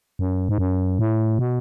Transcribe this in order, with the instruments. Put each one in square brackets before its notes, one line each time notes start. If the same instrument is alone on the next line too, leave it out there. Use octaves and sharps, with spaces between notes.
[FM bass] F#2
G#2
F#2
A2
B2